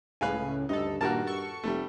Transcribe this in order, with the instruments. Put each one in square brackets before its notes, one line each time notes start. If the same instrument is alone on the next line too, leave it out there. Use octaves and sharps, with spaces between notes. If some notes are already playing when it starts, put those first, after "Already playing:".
[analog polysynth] C#2 A2 C#3 [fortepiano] B4 F5 G#5
[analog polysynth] D2 A4 [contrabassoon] G2 [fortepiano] D#4
[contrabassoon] G2 [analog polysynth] A#2 D#3 A#3 [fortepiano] F#4 A#4 A5
[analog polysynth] A4 C#6
[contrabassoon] F1 [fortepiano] G3 A3